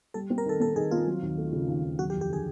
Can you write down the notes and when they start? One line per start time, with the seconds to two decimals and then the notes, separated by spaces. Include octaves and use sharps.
0.14 G3 A4
0.30 C4
0.38 A#4
0.46 D#3 A4
0.60 C4 A4
0.76 D#3 G#4
0.91 C4 F4
1.07 F#3
1.22 D#2
1.38 A3
1.52 C#3
1.68 D#2
1.84 D#2
1.99 F#3 F#4
2.10 G4
2.14 F2
2.21 G4
2.29 D3 G#4